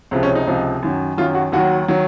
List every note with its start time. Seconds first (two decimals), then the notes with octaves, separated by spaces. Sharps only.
0.11 C#2 C3 F3
0.23 C#4
0.35 D#4
0.47 C#2 C3 F3
0.83 F#2 D#3 F#3
1.17 F#2 D#3 F#3 F4
1.35 F#4
1.52 D#2 D#3 F#3 F#4
1.88 D#3 F#3